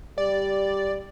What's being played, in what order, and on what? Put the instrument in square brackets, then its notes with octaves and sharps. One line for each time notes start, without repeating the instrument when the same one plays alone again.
[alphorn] G3 [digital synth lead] D5